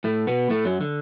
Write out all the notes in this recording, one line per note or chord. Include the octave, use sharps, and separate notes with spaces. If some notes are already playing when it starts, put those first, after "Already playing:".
A2 A3
B2 B3
A2 A3
F#2 F#3
D3